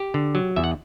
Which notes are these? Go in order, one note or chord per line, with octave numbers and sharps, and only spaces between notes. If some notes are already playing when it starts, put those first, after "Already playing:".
Already playing: G4
D3
F#3
E2 E5
F#5